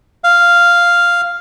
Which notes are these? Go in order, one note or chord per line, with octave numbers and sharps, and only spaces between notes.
F5